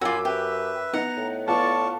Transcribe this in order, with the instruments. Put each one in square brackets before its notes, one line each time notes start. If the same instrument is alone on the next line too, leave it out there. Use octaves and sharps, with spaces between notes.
[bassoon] F#2 [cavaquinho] F4 F#4 [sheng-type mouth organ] G#5 B5 [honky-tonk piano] D6 E6
[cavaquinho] G4 [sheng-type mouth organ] B4 E5
[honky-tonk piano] B3 D#4 [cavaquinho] F#5 [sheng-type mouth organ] A#5
[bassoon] A2
[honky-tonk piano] B3 F4 A4 [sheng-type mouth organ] D5 A5 C#6